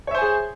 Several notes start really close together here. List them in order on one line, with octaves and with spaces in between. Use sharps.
C#5 E5 C5 G#5 G#4